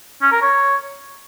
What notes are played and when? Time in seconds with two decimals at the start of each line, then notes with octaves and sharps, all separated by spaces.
0.22 C#4
0.32 A#4
0.42 C#5